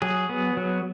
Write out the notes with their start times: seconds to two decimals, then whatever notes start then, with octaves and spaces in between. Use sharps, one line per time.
0.02 F#3 G#4
0.29 B3
0.57 F#3